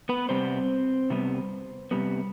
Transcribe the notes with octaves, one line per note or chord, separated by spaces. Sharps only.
B3 B4
C3 G3 B3 C4 C5
C3 G3 B3
C3 G3 B3